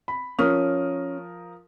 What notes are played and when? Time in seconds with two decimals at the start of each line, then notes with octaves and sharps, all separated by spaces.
0.08 B5
0.39 F3 C#4 A#4 D#6